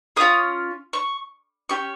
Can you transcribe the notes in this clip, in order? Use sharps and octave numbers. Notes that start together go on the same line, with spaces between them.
C#4 F4 G#4 D#6
C#6
C#4 G4 C#6